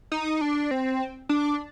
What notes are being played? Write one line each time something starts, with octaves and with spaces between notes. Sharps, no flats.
D#4
D4
C4
D4